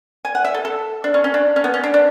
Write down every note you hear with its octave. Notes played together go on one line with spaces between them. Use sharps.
G#5
F#5
E5
A4
A4
D4
C#4
C#4
D4
C#4
B3
C#4
D4
D4